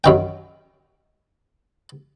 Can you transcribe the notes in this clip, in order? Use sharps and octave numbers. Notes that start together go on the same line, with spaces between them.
F#2 D#3 G5